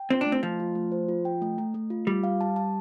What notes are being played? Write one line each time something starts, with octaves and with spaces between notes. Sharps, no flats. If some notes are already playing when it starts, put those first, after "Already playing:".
Already playing: G5
C4 F4
D4
A3
C4
F3 A3
F4
A3
C5
F4
G5
A3
A3
A3
F4
G3 F4
F5
A5
A5